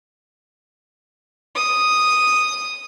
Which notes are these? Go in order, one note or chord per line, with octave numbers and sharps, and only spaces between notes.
D#6